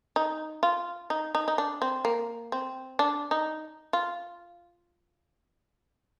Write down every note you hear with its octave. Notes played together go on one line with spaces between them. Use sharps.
D#4
F4
D#4
D#4
D#4
D4
C4
A#3
C4
D4
D#4
F4